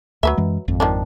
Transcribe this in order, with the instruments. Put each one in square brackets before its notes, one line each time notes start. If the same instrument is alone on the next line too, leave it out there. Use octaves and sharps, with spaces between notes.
[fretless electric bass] D2 [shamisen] F#3 B4 E5
[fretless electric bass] F#2 E3 G#3
G#1 F2
[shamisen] D#3 F3 D4